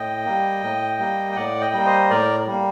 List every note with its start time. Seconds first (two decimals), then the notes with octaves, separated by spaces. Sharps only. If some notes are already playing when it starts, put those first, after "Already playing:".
Already playing: A2 D#5 G5
0.26 G3 A#3
0.63 A2
0.99 G3 A#3
1.32 G5
1.36 A2 D5 F#5
1.61 D#5 G5
1.73 G3 A#3
1.86 C5 D#5
2.10 A2 A#4 D5
2.47 G3 A#3